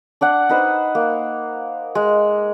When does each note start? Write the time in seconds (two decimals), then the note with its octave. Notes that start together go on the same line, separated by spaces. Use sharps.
0.21 D4 D5 F#5
0.49 D#4 B4 C5
0.95 A#3
1.95 G#3